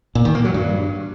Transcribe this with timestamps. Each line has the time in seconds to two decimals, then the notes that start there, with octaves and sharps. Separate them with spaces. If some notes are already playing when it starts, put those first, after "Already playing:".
0.15 A#2
0.25 D#3
0.35 A#3
0.45 F#3
0.54 G2